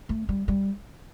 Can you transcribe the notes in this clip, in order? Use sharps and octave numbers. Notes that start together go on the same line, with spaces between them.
A3
G3
G3